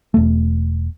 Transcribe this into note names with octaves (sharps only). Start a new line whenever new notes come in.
E1 A3